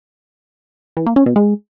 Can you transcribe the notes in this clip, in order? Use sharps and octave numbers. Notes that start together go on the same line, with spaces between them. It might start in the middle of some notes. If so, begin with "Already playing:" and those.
E3
A#3
C#4
B2
G#3